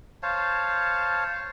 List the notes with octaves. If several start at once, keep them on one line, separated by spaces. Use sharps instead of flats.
C5 C#5 F5 A5